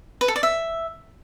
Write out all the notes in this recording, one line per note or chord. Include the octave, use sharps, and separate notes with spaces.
B4
A4
D5
E5